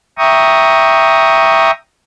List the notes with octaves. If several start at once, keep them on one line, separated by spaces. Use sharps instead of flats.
E5 G5 A#5 C#6 D#6